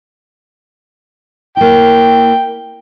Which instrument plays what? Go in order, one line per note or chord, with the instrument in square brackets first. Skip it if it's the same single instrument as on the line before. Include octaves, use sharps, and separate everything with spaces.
[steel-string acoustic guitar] A#3 E4 [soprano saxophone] G5